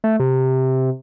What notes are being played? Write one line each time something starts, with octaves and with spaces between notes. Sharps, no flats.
A3
C3